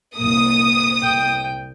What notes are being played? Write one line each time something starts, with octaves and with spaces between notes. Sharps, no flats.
C2 A#3 D#6
C2 G5